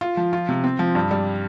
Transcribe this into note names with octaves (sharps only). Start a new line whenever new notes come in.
F4
F3
F4
C3
C4
F3
G2
G3